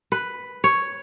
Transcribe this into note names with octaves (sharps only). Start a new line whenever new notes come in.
B4
C#5